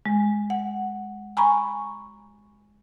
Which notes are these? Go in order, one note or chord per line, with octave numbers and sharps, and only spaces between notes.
G#3
F#5
G#5 A#5 B5 C#6